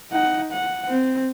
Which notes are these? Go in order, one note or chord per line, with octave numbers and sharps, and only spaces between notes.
D#4 F#5
F#5
C4